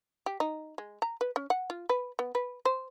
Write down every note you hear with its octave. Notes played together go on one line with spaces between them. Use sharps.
G4
D#4
G#3
A#5
B4
C#4
F#5
F4
B4
B3
B4
C5